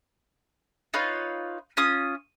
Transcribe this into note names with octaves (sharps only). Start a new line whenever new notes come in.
D#4 F4 B4 C#5
C#4 F4 D#6